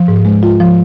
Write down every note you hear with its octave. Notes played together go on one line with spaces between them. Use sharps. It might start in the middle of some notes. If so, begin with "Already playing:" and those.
Already playing: F3
G#2
G#3
F4
F3